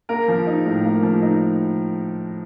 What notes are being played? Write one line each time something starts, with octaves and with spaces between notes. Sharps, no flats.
A#3 A#4
F3
D#4
A2
A#3
F3
D#4